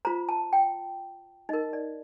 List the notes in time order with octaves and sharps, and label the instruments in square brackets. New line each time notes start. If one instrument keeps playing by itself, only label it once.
[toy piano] F4 C5 A#5
A5
G5
D#4 A#4 D#5
D5